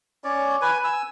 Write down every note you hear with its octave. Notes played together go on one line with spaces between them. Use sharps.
C#4 C#5 D5
B4 G#5
G#5 E6